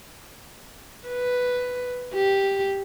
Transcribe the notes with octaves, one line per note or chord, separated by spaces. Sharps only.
B4
G4